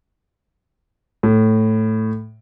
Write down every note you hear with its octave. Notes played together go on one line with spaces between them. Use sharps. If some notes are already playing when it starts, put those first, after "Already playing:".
A2